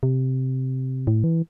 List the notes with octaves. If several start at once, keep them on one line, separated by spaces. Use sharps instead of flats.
C3
A2
E3